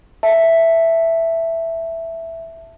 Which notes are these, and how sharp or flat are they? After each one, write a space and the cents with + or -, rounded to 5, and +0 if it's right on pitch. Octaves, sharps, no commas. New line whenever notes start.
E5 +0 A5 +0